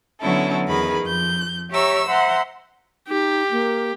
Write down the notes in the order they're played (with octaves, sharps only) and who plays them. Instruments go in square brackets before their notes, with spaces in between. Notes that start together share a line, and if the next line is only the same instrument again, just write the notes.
[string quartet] D3 F#3 B3 C#4 E4 A4
E2 D#3 G#4 B4 B5
F2 G6
G4 C#5 E5 A#5 C#6 E6
C5 E5 F#5 A#5 C6
[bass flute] D#4 [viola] G4
[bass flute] A#3